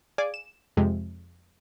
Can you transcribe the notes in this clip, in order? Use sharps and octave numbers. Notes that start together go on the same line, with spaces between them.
G#4 D5 F5 G#5 D6
E7
F2 C3 G#3